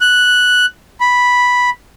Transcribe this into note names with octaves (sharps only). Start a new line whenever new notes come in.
F#6
B5